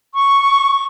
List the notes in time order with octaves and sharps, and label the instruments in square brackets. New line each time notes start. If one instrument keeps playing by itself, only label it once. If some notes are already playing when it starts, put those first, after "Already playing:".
[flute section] C#6